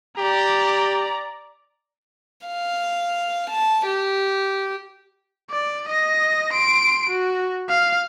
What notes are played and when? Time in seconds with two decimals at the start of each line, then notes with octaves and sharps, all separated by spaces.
0.18 G4 D5 A#5
2.47 F5
3.50 A5
3.86 G4
5.50 D5
5.88 D#5 A#6
6.53 C6 D7
7.09 F#4
7.69 F5